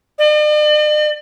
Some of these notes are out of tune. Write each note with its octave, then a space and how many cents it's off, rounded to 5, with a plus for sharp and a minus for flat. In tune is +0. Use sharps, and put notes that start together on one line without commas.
D5 +45